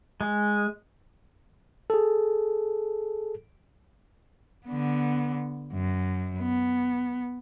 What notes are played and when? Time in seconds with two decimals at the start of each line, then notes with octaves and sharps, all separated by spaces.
0.21 G#3
1.90 G#4 A4
4.66 D3 B3
5.73 F#2
6.39 B3